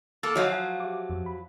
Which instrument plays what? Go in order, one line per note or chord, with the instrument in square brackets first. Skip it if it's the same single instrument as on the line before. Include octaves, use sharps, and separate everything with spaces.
[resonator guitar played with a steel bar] A#3 A4 [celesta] E6 [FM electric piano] A6
[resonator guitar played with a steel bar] F3 F#3 F4 [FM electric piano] F#4 D#5 [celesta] C#5 E5
[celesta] F5 [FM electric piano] G#5
[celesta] G4 E5 [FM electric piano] D6
[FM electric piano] F2
B5